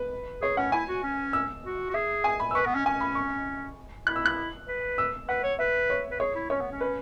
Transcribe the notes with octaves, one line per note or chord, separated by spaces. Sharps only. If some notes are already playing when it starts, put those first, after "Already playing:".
Already playing: B4
G#4 C#5
C#4 F#5
E4 G#5
F#4
C#4
E6
F#4
F#4
G#4 E5
G#5
B5
E6
B4 C#6
B3
C#4
C#4 G#5
B5
C#6
E4 F#6
E6
F#6
B4
E6
B4 F#5
C#5
B4 E5
C#5
B4
G#4 C#5
E4
C#4 C#5
B3
C#4
B4